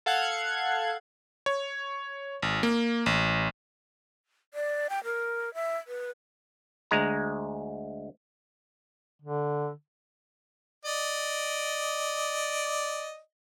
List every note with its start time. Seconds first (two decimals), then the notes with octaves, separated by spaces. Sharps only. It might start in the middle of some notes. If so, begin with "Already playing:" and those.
0.06 A4 F5 F#5 F#6 G#6
1.46 C#5
2.42 G#1
2.63 A#3
3.06 A1
4.54 D5
4.90 G5
5.04 A#4
5.54 E5
5.87 B4
6.91 D2 G#3 A#5
9.22 D3
10.85 D5 D#5